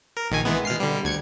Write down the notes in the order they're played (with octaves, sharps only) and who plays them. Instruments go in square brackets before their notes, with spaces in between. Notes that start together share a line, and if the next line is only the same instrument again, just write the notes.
[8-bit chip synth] A#4
A#1 D#3 G#5
E3 G#3 B3
B2 F6 C7
D3 G3
D2 G#6 C#7